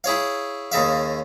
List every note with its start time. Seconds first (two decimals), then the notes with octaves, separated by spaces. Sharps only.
0.04 E4 G#4 C#5 F5
0.72 D#2 C#3 E5 F5